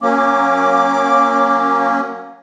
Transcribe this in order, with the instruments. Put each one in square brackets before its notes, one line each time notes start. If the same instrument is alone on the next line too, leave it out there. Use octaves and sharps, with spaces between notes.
[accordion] F#3 A#3 C#4 [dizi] D6